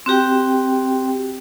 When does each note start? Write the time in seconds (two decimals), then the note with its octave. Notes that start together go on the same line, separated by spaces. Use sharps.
0.06 C4 F#4 G4 G5